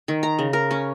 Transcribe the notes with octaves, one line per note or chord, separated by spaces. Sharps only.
D#3
A#5
C#3
A#4
C#4